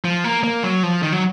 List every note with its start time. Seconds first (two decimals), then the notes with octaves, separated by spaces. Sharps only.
0.05 F3
0.24 A#3
0.44 A#3
0.63 F#3
0.83 F3
1.03 D#3
1.12 F#3